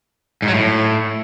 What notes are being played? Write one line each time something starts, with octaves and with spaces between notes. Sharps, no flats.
G#2
F#3
A2